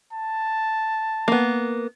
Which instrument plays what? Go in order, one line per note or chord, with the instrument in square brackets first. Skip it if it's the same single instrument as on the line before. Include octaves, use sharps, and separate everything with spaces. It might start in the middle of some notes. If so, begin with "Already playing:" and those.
[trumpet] A5
[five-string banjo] A#3 B3